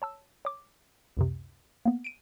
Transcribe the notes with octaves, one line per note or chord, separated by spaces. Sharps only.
C#5 A5 E6
C#5 D6
C#2 F#2 C3
A#3 B3
D7 D#7